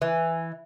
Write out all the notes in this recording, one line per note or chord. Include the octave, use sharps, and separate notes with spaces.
E3